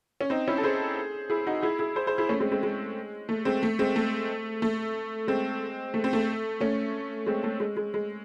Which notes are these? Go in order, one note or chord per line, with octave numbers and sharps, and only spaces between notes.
C#4
C4 D#4
C#4 E4
A4
G#4 C5
E4 G#4
D#4 F#4
E4 G#4
E4 G#4
G#4 C5
G#4 C5
E4 G#4
A3 C#4
G#3 C4
G#3 C4
G#3
A3
G#3 C4
A3
G#3 C4
A3
A3
G#3 C4
A3
C4
A3
A3 C#4
G#3 C4
A3
G#3
G#3
G#3